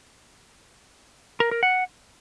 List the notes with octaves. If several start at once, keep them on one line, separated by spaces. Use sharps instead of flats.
A#4
A#4
F#5